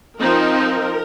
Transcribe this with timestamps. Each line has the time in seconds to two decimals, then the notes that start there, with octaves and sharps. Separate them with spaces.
0.19 F3 C4 D#4 A#4